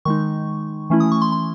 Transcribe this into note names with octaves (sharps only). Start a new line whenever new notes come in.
D#3 G#3 D#4 C#6
E3 A3 C#4 E4
D#6
C#6
C6
C6